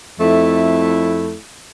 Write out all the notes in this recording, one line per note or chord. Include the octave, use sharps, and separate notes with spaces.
F2 A3 E4